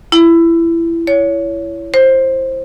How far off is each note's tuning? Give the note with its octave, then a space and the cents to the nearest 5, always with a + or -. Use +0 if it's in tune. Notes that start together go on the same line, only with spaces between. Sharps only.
E4 +20
C#5 +20
C5 +15